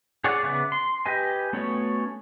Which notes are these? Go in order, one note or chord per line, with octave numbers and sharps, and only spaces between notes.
G#4 C#5 D5 F#5
C#3 B3 E5 D6 F#6
C6
G4 B4 D#5 G#5
A3 B3 C#4 F#4 C#5